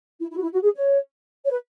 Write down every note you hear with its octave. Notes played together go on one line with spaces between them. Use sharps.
E4
E4
F#4
E4
F#4
G#4
C#5
C#5
B4